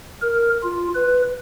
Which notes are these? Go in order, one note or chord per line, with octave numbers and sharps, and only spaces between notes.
A#4
F4
B4